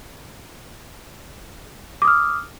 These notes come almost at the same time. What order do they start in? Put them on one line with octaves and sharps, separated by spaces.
D6 D#6 F6